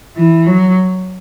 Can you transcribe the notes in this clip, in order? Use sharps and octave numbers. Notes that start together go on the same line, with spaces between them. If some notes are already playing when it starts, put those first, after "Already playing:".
E3
F#3